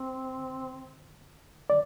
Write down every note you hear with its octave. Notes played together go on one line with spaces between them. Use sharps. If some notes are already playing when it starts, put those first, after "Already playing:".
Already playing: C4
D5